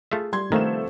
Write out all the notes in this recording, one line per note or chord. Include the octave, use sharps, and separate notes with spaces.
A3 F4 G#4 E5
G3 C6 G#6
C3 D#3 F3 A3 B3 E7